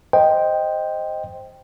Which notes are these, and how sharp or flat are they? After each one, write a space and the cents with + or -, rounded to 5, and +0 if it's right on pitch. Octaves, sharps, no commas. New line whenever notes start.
C5 +0 D#5 +0 G5 +0